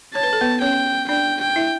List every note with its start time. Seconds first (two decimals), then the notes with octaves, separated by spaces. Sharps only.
0.14 C#5 A5
0.23 B4
0.33 A4
0.41 B3 B4
0.61 C#4 C#5 G5
1.09 D4 D5 G5
1.41 G5
1.56 E4 E5